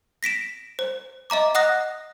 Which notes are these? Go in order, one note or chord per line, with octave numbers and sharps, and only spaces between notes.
A#6 B6 D7 E7
C5
D#5 E5 A#5 D6
D#5 F#5 D#6 F#6 A#6